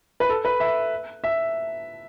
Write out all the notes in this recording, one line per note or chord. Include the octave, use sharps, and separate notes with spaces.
B4
A4
B4
E5
E5